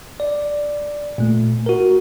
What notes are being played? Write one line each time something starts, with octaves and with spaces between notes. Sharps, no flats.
D5
A#2 A3
F#4 A#4